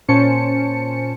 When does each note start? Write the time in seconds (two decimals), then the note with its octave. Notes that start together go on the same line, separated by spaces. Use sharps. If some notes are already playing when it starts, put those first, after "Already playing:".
0.08 A#2 C#4 C5 A5 C#7